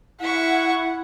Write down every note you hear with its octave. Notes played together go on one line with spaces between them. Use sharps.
E4 E5 F#5 C#6